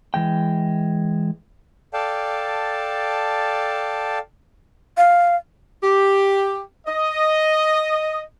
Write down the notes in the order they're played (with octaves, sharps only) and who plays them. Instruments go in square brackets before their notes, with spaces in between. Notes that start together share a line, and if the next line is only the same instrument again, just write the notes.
[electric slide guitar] E3 G#3 G5
[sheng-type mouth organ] A4 D5 F5 G5 A5
[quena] F5
[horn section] G4
D#5